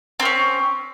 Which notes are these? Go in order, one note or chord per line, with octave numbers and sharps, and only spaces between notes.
A#3 C4 C#4